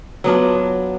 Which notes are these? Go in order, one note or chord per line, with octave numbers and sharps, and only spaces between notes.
F#3 B3 D4 F4